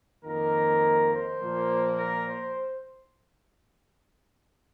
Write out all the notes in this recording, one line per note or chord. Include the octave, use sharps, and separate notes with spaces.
F2 D#3 A#3 A#4
C5
A#2 F3 A#3
A#4
C5